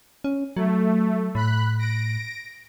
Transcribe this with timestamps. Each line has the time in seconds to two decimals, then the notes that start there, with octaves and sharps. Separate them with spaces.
0.24 C#4
0.57 F#3 A3
1.35 A2 B5 F#6
1.79 A#6 D7